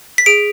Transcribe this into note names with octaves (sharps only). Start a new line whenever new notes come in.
B6
G#4 D7